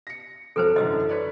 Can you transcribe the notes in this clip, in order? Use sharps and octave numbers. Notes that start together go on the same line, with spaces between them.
A#6 C#7
F2 F#3 A4 B4 C5
F#2 D3 E3 D#5 E6
B4 C#5 D5